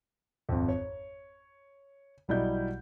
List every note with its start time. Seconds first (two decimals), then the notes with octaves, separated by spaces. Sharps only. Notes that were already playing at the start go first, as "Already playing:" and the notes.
0.49 G#1 F2
0.68 C#5
2.28 B1 F#3 G3 E4 D#5 G6